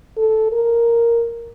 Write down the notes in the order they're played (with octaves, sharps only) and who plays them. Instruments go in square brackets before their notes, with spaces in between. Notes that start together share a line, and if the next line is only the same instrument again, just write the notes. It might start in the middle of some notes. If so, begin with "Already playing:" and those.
[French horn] A4
A#4